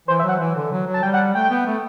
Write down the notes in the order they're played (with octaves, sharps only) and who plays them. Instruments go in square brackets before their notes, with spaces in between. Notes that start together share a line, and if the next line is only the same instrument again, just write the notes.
[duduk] E3 [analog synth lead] C5
[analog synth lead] E5
[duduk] F#3 [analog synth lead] F#5
[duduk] E3
D3
F#3
F#3
[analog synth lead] A5
[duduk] G3 [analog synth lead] G5
[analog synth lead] F#5
[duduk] A3 [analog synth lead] G5
[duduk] B3
A3